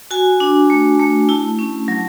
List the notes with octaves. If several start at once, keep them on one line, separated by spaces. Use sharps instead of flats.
F#4 G#5
D4
A3
A3
E4 A5
C#4
F#3